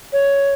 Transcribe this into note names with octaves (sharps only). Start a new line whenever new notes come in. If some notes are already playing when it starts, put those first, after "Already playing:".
C#5